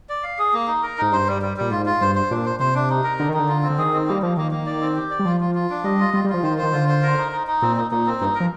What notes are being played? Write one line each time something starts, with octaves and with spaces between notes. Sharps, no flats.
D5
F5
G#4
A#3
D#4
A#4
G#2 D#4
G2 C5
G3
G3
A#2 G3
G#2 F4
F4
G2 C5
C5
A#2 D4
C5
C3 C5
D4
D#4
A#4
D3 D#4
D#3 D#4
D3
F4
C4
D3
D#3 G#4
C4
G3 A#3
F3 A#3
D#3 A#3
A#3
D5
C4
G4
D5
G3
F3 F4
F4
F4
D4
G3 D#5
F4
G3 F4
G3
F3 F4
D#3 C5
D#3 C5
D3 F4
C5
A#4
D#4
D#4
D#4
A#2 C4
D#4
A#2 D#4
C4
G2 D#4
A#4
F3